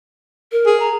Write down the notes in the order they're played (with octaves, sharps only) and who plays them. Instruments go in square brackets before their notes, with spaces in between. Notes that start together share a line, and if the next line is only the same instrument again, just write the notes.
[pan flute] A#4
[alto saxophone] G#4
[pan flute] A#5